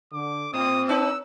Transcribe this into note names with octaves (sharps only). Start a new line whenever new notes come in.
D3 D6
A2 C4 D#6
C#4 D#4 B4 E6